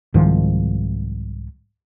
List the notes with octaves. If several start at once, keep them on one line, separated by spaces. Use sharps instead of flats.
C2 G#2 D#3 F3